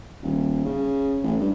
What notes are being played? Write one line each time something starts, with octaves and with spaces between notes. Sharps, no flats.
D#1
C#3
A1
G2